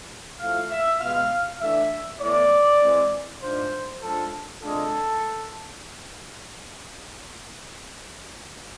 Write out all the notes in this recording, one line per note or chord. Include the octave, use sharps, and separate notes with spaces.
F3 A3 E4 F5
E5
B2 G#3 B3 F5
E3 A3 D4 E5
A2 E3 B3 E4 D5
E3 G#3 C4
G#2 G#3 D4 F4 C5
F3 G#3 D4 F4 A4
C3 G#3 D4 F4 A4